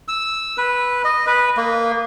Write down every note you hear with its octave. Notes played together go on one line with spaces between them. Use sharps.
E6
B4
D#5
B4
A#3